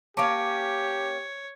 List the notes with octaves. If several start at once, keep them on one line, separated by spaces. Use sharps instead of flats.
A#3 C#4 G4 C#5 A5 D6 D7